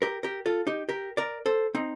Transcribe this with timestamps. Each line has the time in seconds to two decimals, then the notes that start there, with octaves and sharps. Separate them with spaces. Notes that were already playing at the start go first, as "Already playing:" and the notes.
0.02 G4 A#4
0.23 G4 A#4
0.46 F4 A4
0.67 D#4 G4
0.89 G4 A#4
1.17 A#4 D5
1.46 A4 C5
1.75 C4 D#4